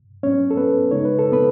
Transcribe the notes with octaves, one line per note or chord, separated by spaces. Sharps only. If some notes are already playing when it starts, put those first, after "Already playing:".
G#2 F#3 B3 C#4 C#5
A4
B3 B4
C#3 G#3 D#4 C#5
B4
A4
B3 B4